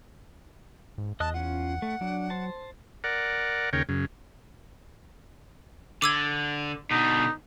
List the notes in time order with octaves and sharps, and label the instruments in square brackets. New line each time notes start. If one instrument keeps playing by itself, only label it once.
[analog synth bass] G#2
[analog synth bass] E2 [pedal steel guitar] D#5 D#6 F#6 [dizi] A5
[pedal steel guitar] C#4 F4 [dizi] F#5
[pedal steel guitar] A3
[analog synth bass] F#3 [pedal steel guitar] D4
[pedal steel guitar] C5 A5
[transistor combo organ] A#4 D5 F#5
D#2 C#3 A#4 C#5 G5
F#2 C#3
[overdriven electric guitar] D3 [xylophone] D6 E6 G#6
[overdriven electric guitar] B2 D3 [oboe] D#4